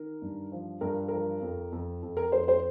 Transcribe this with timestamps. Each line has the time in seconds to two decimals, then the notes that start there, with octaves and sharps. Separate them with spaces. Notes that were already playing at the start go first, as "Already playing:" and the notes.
Already playing: D#3 A#4
0.22 G2
0.52 F3
0.81 G2 A#4
1.08 F3 A#4
1.41 F2
1.72 F2
2.03 F2
2.17 A#4
2.32 F2 C5
2.48 C5